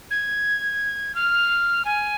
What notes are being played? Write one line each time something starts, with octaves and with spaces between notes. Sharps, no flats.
G#6
F6
G#5